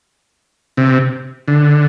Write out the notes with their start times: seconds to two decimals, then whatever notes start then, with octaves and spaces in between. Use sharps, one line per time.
0.77 C3
1.48 D3